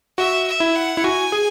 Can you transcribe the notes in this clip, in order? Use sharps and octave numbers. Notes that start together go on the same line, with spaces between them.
F#4 E5
E5
E4
F#5
E4
F#4 G#5
G#4